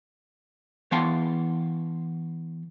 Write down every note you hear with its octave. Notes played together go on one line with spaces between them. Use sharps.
E3 B3 F5 G5 A5 C6